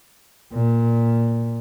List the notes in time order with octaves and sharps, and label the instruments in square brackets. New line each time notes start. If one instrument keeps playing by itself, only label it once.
[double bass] A#2